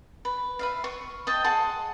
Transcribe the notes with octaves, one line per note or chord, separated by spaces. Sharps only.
B4
B4 E5 F5
C#6
D#5 G5 A5
G#4 F#5 A5 C6